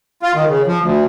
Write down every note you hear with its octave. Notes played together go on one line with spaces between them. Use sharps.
F4
D#3
C#3
F3
D2